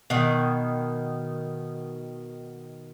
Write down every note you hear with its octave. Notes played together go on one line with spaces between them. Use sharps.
B2 D#3